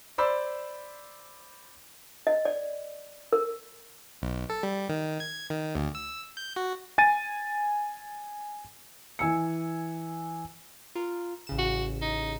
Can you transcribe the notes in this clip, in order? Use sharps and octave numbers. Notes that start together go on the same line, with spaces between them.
C5 D5 B5 E6
D#5
D5
A#4
B1
A4
G3
D#3
G#6
D#3
D2
E6
G6
F#4
G#5 A6 D#7
E3 G#5 E6 C#7
F4 A#4
A1 C#3 E7
F#4
D#4